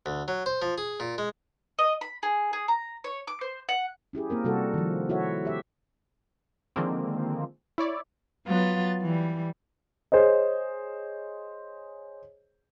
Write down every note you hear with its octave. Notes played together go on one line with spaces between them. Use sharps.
D2
F#3
C5
F3
G#4
A#2
G#3
D#5
B5
G#4
G#4
A#5
C#5
D6
C5
F#5
C#4 E4 G4 G#4
A#3 C4 A#4
C3 G3 F#4 A4
D#3 F3
E4 F#4 A4 C#5 E5
G4 E5
D3 D#3 F3 G#3 A#3 C4
E4 C#5 D5
F#3 B3 F4 A6
E3 G3
G#4 C5 C#5 D#5